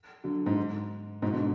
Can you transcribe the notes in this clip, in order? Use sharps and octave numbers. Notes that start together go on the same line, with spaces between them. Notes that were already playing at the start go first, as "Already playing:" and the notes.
D3 F#3
G#2
G#2 B2
B2 D3